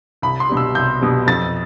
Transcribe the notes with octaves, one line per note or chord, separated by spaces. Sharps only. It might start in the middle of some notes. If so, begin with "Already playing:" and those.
C2 B5
C6
B2 G3
E6
C2 G6
B2 G3
F2 A6